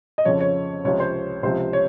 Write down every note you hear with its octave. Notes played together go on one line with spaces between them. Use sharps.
D#5
F2 C#3 F3 C#5
C#5
C#2 C3 F3 C#5
C5
C#2 C3 F3 C5
C#5